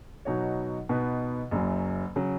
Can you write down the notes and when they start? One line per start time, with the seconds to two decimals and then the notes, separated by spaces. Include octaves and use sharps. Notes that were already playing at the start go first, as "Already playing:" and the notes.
0.25 B2 F#3 D#4 F#4 C#5
0.89 B2 B3 D#4 B4
1.51 F#1 F#2 F#3
2.16 C#3 F#3